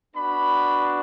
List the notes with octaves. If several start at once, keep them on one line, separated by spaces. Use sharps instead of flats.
B3 D4 F#4 B5